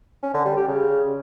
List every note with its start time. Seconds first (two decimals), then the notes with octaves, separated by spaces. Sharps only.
0.23 C#4
0.34 D3
0.45 G3
0.57 G4
0.68 C#3